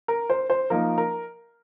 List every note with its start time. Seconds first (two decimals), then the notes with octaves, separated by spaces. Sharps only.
0.08 A#4
0.30 C5
0.50 C5
0.70 F3 A#3 D#4 A#4
0.98 A#4